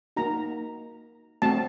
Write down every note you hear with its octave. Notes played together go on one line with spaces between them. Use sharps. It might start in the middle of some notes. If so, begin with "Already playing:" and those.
A#3 D#4 F#4 A#5
A3 C4 F#4 A5